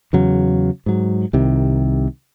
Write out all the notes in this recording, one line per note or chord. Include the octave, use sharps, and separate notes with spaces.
E2 C#3 F#3
G#2 F#3
C2 C3 D#3